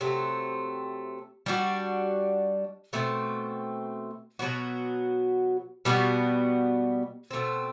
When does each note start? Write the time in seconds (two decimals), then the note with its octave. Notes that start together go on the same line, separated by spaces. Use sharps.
0.01 C3 F#3 A3 C4
1.46 G3 D4 F#4
2.93 B2 A3 C4
4.39 B2 F#3 B3 F#4
5.85 B2 G3 B3 F#4
7.31 B2 A3 C4